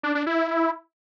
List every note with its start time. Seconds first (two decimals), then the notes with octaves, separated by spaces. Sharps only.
0.03 D4
0.15 D4
0.27 E4